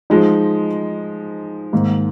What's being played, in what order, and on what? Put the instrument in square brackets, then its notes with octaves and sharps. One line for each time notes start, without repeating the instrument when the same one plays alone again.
[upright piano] F3 G#3 D#4
G#2 D#3 A#3